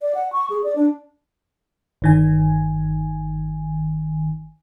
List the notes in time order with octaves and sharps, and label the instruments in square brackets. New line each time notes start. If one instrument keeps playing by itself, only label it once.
[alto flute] D5
F#5
C#6
G#4
D5
D4
[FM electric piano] G1 D#3 G#5